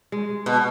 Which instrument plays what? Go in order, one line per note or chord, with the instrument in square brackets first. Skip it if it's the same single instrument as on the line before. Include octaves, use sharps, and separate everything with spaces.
[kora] G#3
[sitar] B2